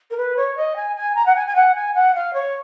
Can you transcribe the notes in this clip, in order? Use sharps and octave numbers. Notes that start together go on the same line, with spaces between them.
A#4
B4
C#5
D#5
G#5
G#5
A#5
F#5
G#5
G#5
F#5
G#5
F#5
F5
C#5